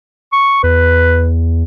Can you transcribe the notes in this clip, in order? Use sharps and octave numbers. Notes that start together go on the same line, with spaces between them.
C#6
E2 B4